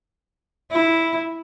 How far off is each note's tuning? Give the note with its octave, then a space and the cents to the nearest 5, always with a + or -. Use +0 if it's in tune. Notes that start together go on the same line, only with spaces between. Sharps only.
E4 -5